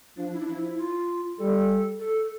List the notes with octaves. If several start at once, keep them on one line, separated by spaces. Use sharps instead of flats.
F3 D4
E4
D4
F3 E4
E4
F4
G3 A4
A4